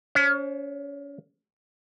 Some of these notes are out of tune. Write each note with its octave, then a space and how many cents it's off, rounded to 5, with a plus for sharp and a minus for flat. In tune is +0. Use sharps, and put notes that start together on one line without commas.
C#4 +30 C#5 -45